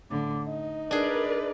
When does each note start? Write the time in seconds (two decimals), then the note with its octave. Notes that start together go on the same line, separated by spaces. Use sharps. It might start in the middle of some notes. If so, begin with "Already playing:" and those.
0.10 A2 D3 D6
0.46 D#4 D#5
0.91 D4 G#4 A#4 B4 D5